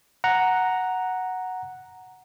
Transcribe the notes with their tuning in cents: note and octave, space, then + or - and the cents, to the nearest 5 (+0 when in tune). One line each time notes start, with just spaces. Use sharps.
F#5 +0 A#5 +0